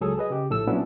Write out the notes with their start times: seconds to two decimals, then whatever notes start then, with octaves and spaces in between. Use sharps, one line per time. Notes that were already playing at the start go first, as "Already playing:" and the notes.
0.01 C#2 F#3 G#4 A4
0.18 G#4 B4 D#5
0.30 C#3 G4
0.49 A#1 A2 A4 E6
0.67 A#2 F#3 B3 C#4 D4 E4